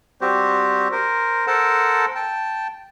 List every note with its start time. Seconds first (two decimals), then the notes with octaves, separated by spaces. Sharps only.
0.21 G3 C4 F#4 G4 C5
0.92 A#4 C5
1.47 A4 A#4 C5 F#5 A5
2.15 G5 A5